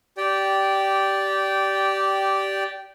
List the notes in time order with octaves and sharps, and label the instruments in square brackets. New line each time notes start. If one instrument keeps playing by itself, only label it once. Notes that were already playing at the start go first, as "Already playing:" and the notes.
[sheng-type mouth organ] G4 D5 G5